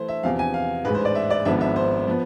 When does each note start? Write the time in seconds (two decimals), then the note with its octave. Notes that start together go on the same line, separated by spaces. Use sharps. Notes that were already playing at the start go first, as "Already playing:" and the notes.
Already playing: E3 A3 C5
0.08 E5
0.23 E2 C3 F3 F5
0.39 G#5
0.54 F5
0.85 A1 G#2 G#3 B4
0.95 C5
1.05 D5
1.15 E5
1.30 D5
1.45 G#1 G#2 F3 B3 D4 E5
1.61 E5
1.76 C5
2.08 F3 B3